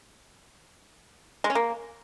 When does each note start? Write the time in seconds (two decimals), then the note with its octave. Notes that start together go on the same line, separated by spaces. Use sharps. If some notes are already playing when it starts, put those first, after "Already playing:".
1.44 G#3
1.50 C#4
1.55 A#3